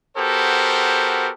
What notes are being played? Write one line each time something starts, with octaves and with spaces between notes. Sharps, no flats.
B3 F#4 G4 A4 A#4 C5